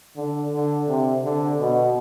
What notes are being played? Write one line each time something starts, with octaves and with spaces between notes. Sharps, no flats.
D3
D3
C3
D3
B2